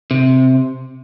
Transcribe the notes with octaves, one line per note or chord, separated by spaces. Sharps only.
C3